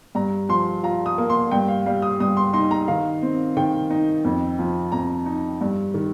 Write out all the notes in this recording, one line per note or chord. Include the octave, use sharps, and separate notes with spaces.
G2 A#5
F3 C6
F4 A#5
D#6
A#3
C6
G2 G5
F5
G3 F5
D#6
G2 D#6
C6
D#4 C6
A#5
D#3 F5
C4
D#3 G5
D#4
F2
F3
F2 A#5
D#4
G2
D#3